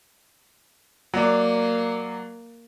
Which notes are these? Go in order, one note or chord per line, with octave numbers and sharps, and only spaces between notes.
F#3 A#3 D5